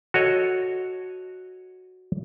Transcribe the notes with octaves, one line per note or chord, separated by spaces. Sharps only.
F#4 A4 C#5 D#5